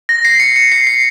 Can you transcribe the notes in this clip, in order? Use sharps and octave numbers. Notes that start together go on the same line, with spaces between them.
A#6
C7
C#7
C#7
C7
C7